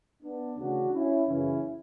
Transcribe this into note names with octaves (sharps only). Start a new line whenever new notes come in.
B3 D4
D2 C#3 E3 D4 F#4
C#4 E4
F#2 C#3 E3 C#4 E4